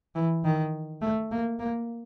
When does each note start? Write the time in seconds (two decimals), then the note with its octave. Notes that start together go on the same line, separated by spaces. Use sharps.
0.15 E3
0.44 D#3
1.02 A3
1.32 A#3
1.59 A#3